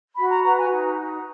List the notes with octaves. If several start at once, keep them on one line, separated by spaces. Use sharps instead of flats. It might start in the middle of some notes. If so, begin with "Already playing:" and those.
F#4 B5
A#5
B4 A#5
G#5
D#4
F#4